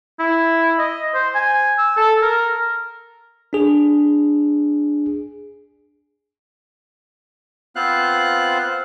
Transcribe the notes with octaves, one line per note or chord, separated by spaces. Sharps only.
E4
D#5
C5
G#5
E6
A4
A#4
D4 G#4
B3 C4 F4 C5 F5 F#6